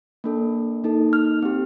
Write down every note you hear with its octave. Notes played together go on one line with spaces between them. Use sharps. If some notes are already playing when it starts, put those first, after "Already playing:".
A#3 D4 A4
A#3 D#4 A4
F6
C4 G4